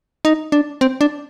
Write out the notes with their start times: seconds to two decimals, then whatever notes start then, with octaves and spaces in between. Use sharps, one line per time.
0.25 D#4
0.52 D4
0.81 C4
1.01 D4